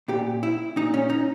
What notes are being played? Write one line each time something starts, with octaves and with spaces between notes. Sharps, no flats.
A#2 G4
E4
A#2 D#4
C#4
D#4